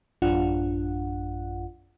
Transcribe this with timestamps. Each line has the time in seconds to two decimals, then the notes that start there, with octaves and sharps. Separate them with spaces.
0.22 A1 F#2 D4 F4 F#5